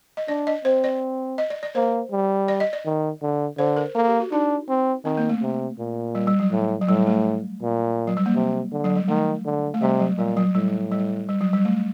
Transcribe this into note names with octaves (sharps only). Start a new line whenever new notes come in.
D#5
D4 D5
D#5
C4 C5
D5
D#5
D5
D5
A#3 C5
G3
D5
D#5
D5
D#3
D3
D3 C5
A#4
A#3 A4
G4
F#4
D4 D#4
C4
D#3 C4
A#3
A3
C3
A#2
G3
G3
F#3
A2
F#3
A2 G3
A3
A#2
F#3
G3
A#3
C3
D3
F#3
G3
D#3 A3
D3
A3
C3 G3
F#3
A#2 G3
F#3
A2 G3
G3
G3
F#3
G3
A3